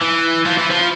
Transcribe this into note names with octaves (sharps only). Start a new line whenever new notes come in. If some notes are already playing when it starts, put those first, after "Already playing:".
E3
F3
E3
F3